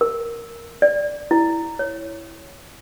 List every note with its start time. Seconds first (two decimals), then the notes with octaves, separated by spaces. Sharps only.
0.01 A#4
0.82 D5
1.31 E4
1.79 C#5